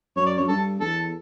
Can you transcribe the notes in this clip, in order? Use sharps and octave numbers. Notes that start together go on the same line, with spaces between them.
F#2 C#5
D5
F#2 C#5
G2 A4
E2 A4